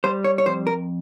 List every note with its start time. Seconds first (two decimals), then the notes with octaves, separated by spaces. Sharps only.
0.04 G3 C5
0.24 C#5
0.38 C#5
0.46 F2 C5
0.67 A#4